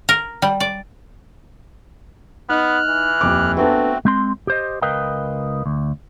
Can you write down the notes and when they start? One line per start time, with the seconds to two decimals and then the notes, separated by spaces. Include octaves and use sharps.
0.09 A#4
0.42 G3
0.60 D5
2.49 B3 D#4 D#5 F6 F#6
2.88 E3
3.21 D#1 F2 D6
3.57 A3 B3 C4 D4 F#4 A4
4.05 G#3 C4 C6
4.47 G4 C5 D#5
4.82 C#2 A#4 B4 D#5 F5 G5
5.66 D2